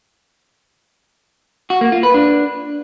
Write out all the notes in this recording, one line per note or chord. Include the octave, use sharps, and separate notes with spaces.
F#4
A#3
F4
B4
D4